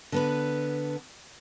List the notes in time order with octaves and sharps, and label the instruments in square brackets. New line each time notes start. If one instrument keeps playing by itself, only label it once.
[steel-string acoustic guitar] D3 B3 B4